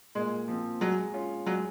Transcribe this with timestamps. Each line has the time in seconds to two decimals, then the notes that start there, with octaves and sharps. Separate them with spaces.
0.15 A#2 G#3
0.48 F3 C4
0.81 F#3 G#3
1.14 C#4 F4
1.46 F#3 G#3